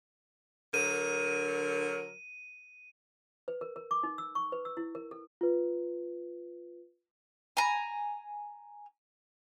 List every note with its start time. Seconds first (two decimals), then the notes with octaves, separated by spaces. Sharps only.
0.74 D3 F#3 A#4 D#7
3.48 B4
3.61 A#4
3.76 A#4
3.91 D6
4.03 D#4
4.18 E6
4.35 C#6
4.52 B4
4.65 E6
4.77 E4
4.95 A#4
5.11 A4
5.41 F4 B4
7.57 G#5 A#5